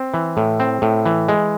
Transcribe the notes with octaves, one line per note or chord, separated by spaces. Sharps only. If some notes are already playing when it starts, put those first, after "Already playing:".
Already playing: C4
E3
A2
C4
A2
E3
G#3